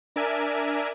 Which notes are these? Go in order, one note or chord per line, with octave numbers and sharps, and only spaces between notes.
D4 A#4 D5 E5 G#5